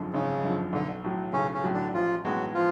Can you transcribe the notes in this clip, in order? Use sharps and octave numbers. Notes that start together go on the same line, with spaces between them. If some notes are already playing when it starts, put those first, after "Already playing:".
Already playing: G#1 F#2 D3 F3
G#1 C#3
F#2 D3 F3
B1 D3
A2 F#3
B1 C#3 C#4
C#3 C#4
A2 F#3
D3 D4
A1 F3 F4
A2 F#3 G#3 B3 F#4
F3 F4